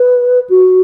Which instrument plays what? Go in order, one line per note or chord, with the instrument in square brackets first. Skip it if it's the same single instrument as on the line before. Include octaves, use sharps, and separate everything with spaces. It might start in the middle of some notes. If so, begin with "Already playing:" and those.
Already playing: [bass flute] B4
F#4